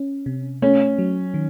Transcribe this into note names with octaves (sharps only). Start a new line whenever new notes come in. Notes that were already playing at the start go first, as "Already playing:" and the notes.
Already playing: C#4
C3
A3 C#4
F#3
D#3